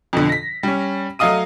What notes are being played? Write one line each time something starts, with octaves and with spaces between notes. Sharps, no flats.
F2 B2 D3
A#6 B6
G3 C#4
F#3 A3 D#5 F5 D#6 D#7